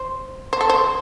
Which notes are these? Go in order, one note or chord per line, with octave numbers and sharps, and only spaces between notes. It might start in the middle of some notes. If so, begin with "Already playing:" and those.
Already playing: C5
C5
A4
C5